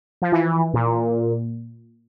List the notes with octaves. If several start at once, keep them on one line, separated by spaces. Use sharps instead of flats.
F3
E3
A#2